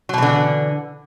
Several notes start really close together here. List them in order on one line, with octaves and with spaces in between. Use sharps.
F#3 B2 E3 D3